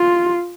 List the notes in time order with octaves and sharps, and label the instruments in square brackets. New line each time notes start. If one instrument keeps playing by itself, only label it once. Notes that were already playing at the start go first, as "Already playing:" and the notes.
Already playing: [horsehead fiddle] F4